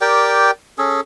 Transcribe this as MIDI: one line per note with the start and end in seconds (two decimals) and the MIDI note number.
0.01 0.51 67
0.01 0.51 70
0.01 0.51 74
0.01 0.51 79
0.78 1.01 61
0.78 1.01 68
0.78 1.01 69